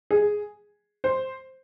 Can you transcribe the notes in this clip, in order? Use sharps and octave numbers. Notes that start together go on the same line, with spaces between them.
G#4
C5